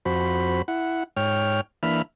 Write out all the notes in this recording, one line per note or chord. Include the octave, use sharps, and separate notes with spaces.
F2 F#4 C5 B5
E4 F#5
G#2 C#5 G5 F6
E3 A#3 D4 E5 B5 F6